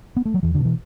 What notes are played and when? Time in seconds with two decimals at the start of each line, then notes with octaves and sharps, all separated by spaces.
0.17 B3
0.25 A3
0.34 F#3
0.43 E2 E3
0.55 D3
0.60 B2
0.65 E3